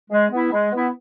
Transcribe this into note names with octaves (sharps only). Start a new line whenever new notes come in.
G#3
B3 E4
G#3
B3 E4